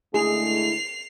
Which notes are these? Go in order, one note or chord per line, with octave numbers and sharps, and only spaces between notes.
D3 G#3 A3 E4 G#4 C7 F7